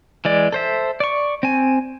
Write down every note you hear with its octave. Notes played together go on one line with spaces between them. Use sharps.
E3 G#3 D5
A4 C5 E5
D5 C#6
C4 G#5